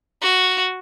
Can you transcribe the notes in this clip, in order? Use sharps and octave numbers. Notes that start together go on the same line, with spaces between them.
F#4